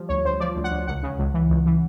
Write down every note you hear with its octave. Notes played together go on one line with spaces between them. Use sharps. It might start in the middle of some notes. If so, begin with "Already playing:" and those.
Already playing: F3 G3
D2 C#5
D2 C5
F3 D5
D2
F#5
D2
C#2 F#5
C#3
C#2
E3
C#2
E3